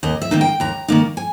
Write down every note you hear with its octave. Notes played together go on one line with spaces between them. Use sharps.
D#2 D#5
E5
D#3 A#3 D#4
G5
D#2 A#5
D#3 A#3 D#4
G#5